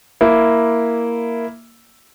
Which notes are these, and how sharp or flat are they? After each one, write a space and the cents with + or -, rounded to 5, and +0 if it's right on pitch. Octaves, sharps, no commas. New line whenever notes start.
A#3 +0 E4 +0